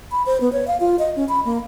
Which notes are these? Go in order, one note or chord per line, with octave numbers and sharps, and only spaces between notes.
B5
C5
B3
C#5
F5
F4
D#5
C#4
B5
A#3